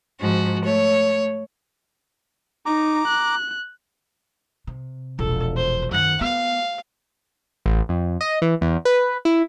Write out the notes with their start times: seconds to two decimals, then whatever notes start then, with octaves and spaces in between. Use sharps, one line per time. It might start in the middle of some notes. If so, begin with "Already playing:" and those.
0.20 G#2 F3 F#4
0.64 A3 C#5
2.66 D#4 A#5 D6
3.07 F#6
4.67 C3
5.19 E1 A#1 A4
5.56 C5
5.91 F#2 D#3 F#5
6.21 B3 F5
7.66 A1
7.89 F2
8.21 D#5
8.42 E3
8.61 E2
8.85 B4
9.25 E4